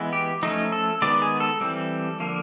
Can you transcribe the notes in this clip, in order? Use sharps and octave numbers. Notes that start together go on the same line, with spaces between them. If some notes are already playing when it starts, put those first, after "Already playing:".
Already playing: E3 G#3 B3
G4
F3 A3 C#4 D#4
A4
D#3 G#3 B3 D5
G#4
A4
E3 G3 C4
D3 F3 A#3